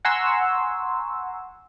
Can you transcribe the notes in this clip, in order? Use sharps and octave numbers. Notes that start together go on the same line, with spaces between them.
F#5 G#5 A#5 C6 C#6 E6